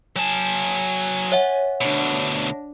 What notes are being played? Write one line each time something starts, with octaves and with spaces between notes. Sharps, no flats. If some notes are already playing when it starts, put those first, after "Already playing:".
F#3 G#5 A5
C#5 E5 F#5
D2 B2 D4